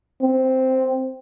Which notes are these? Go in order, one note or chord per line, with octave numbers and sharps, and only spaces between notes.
C4